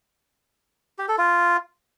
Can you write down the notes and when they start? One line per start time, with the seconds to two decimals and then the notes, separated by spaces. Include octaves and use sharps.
0.99 G4
1.08 A4
1.18 F4